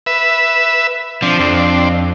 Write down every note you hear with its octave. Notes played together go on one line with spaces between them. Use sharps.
B4 E5
F3 C4 D4
F2